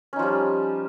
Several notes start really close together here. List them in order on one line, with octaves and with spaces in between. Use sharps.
C#4 D#4 F3 G3